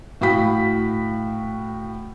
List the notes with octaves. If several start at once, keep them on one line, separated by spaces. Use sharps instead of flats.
A2 F#4 F5 G5 B5 B6